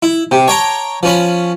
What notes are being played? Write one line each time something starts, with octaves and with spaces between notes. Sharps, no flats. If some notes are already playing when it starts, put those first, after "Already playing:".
E4
C3 G4
C#5 G5 A5 A#5
F3 C#4 B5